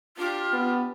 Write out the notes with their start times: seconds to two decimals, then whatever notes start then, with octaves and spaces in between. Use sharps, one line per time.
0.17 D4 F4 G4
0.53 B3